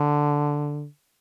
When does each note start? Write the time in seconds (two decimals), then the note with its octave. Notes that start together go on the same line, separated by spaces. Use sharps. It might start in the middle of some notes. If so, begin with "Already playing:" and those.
Already playing: D3